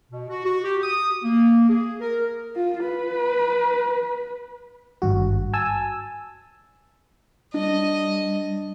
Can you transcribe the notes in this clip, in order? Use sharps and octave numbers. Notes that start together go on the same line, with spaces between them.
B2
F#4
F#4
G4
D#6
A#3
G#4
A#4
F4
B4
G#1 G2 F#4
G#5 A5 E6
G3 D4 D#5